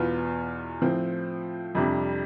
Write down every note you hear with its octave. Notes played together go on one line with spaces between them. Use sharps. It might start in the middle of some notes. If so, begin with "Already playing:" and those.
Already playing: E2 B2 B3 F4
A2 F3 C4
F2 C3 G3 D4